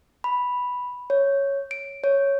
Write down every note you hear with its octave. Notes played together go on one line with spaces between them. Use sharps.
B5
C#5
D7
C#5